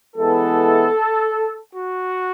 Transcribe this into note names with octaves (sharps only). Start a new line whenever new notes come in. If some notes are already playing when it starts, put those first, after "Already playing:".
E3 G#3 B3 E4 A4
F#4